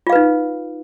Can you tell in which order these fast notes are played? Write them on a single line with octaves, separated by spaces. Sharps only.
F4 F5 B4 D#4